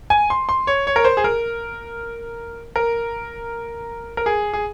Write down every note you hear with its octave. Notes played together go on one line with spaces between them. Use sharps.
G#5
C6
C6
C#5
C#5
A#4
C5
G#4
A#4
A#4
A#4
G#4
G#4